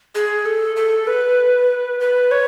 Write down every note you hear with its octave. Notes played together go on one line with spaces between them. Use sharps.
G#4
A4
A4
B4
B4
C#5